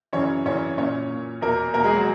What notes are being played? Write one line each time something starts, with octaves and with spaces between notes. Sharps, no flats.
F#2 C#3 E3 C#4 C#5
F#2 C#3 E3 C#4 C#5
A#2 C#4 C#5
A#2
E2 B2 A#3 A#4
E2 B2 A#3 A#4
G#3 G#4
F#3 F#4